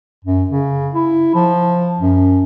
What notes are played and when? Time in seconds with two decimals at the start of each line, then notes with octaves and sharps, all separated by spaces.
0.24 F#2
0.51 C#3
0.94 E4
1.35 F3
2.00 F#2